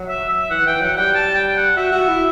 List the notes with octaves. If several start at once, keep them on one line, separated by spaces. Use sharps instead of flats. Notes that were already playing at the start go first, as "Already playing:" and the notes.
Already playing: F#3
E5
E5
E3 F#5
E3 G5
F#3 F#5
G3 G5
A5
G5
F#5
F#4 E5
F#4
E4